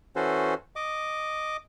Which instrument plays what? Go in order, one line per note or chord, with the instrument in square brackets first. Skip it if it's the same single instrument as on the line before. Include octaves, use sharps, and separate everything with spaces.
[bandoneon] E3 C#4 F#4 A4 C5
D#5 D6